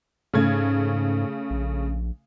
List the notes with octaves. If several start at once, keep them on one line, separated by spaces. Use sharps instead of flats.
G#2 C#3 A3 G#6
A#1